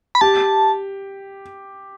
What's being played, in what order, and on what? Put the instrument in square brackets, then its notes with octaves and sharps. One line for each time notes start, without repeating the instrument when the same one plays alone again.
[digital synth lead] B5
[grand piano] G4 [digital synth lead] A5